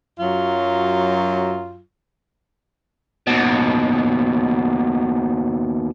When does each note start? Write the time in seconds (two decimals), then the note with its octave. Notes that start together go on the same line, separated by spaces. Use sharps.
0.19 F#2 F#3 F4
3.27 D#2 B2